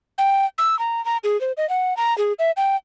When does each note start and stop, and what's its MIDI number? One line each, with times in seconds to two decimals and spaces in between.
0.18 0.45 79
0.58 0.78 88
0.79 1.03 82
1.05 1.17 82
1.24 1.39 68
1.41 1.52 72
1.57 1.68 75
1.69 1.96 78
1.97 2.16 82
2.18 2.33 68
2.39 2.51 76
2.57 2.76 79